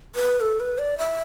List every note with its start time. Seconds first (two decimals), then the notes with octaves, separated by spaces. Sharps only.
0.15 B4
0.41 A4
0.60 B4
0.78 D5
0.98 E5